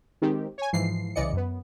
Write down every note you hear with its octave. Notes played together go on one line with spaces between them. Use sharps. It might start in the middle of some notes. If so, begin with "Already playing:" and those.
D#3 G#3 C4 G4
C#5 G#5
G#2 E3 F3 C7
C2 C#3 E3 D5 D#5 C#7
F#2 B3